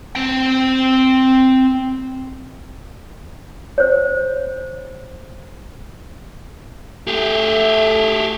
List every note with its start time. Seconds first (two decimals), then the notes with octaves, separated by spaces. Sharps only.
0.15 C4 G5
3.78 C5 C#5
7.07 A3 G4 G#4